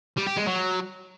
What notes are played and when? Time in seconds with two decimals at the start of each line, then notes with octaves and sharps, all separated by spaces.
0.17 G3
0.27 G4
0.37 G#3
0.47 F#3